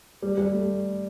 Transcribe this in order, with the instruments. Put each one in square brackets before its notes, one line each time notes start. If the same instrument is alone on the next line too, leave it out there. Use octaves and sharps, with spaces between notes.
[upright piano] G3
G3
A3